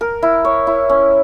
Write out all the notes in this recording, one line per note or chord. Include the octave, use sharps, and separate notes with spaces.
A#4
E4
C#5
E4
C#4